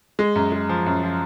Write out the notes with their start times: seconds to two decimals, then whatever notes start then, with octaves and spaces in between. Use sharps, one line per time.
0.19 G#3
0.35 F#2
0.52 G#3
0.69 F3
0.86 F#2
1.03 F3